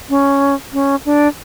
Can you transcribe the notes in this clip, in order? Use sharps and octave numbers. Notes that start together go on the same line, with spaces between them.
C#4
C#4
D4